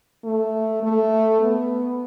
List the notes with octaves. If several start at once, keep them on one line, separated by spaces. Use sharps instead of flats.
A3
A3
B3